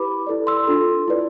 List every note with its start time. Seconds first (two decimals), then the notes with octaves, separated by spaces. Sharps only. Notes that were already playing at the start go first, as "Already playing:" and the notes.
Already playing: E4 G4 B4 B5 D6
0.27 E4 A4 D5
0.47 C6 E6
0.67 D4 F4 A4
1.08 E4 B4 D5